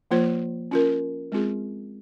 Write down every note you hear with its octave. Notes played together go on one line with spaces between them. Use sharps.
F3 A#3 F4 C5
C#4 F4 A#4
G#3 C4 F4 G#4